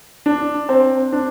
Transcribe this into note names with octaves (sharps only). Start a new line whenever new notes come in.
D4
C4
D4